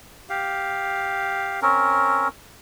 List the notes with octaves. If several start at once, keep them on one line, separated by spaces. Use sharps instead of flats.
G4 F5
C4 C#4 A#4